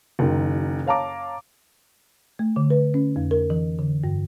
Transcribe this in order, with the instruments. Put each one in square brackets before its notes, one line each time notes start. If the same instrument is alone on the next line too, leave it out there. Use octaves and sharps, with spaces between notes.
[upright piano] F#1 D#3
C#5 F5 A5 A#5 D6
[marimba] A3
D3
B4
C#4
F2
A#4
E3
D3
G2